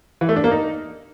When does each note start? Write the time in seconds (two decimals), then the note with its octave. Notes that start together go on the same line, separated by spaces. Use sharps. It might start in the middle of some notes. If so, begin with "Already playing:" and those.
0.21 E3
0.29 A3
0.36 D4
0.44 A#3
0.51 D#4